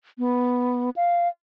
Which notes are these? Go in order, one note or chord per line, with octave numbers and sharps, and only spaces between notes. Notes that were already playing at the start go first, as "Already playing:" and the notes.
B3
F5